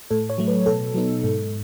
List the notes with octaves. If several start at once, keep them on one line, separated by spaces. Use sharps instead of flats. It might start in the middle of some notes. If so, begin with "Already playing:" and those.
A2 A4
C#5
F#3 A3
B4
B2 A4
F#3 B3 D#4
G#2